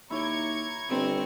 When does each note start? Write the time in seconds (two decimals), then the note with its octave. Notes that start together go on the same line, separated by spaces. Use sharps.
0.10 D#2 E4 C#5 A#5 C#6 D6 G#6
0.90 G1 C4